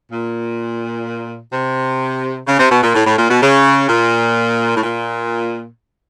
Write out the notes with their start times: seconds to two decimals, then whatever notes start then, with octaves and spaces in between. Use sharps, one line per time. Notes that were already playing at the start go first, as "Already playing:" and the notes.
0.12 A#2
1.53 C3
2.48 C#3
2.60 C3
2.72 B2
2.83 A#2
2.95 A2
3.07 A2
3.18 A#2
3.30 B2
3.43 C#3
3.89 A#2
4.77 A2
4.83 A#2